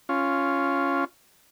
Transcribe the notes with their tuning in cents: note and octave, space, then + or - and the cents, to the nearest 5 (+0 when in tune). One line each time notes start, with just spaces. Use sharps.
C#4 +0 F4 -5